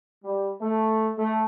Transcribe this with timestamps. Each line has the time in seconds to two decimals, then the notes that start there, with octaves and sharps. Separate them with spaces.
0.24 G3
0.60 A3
1.17 A3